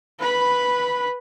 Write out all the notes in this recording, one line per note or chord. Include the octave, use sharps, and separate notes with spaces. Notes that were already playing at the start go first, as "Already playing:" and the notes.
B4 B5